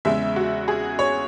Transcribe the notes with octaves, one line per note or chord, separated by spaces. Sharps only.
E2 C#3 G#3 E5
F#4
G#4
C#5